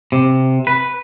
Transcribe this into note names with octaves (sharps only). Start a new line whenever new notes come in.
C3
B4